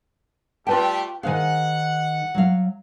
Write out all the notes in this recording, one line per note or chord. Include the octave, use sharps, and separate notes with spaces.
G3 A3 F4 G4 B4 G5 A5
D#3 G#4 C5 F5 F#5 G#5
F#3 F5